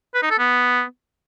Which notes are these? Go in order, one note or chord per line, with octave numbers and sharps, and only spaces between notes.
B4
D#4
A4
B3